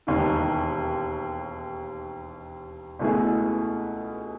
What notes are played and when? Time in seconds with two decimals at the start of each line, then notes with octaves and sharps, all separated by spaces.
0.07 E1 D#2 D#3
2.99 C#2 B2 A3 E4 G#4